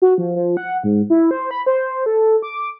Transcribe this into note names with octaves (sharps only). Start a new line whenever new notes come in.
F#4
F3
F3
F#5
G#2
E4
C5
B5
C5
A4
D6